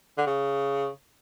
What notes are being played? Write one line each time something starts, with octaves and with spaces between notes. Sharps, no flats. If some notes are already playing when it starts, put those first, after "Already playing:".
D3
C#3